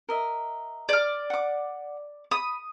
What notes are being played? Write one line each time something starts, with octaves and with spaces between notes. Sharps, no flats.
A#4 D#5 E5
D5 F6
F#5 D6
B5 D#6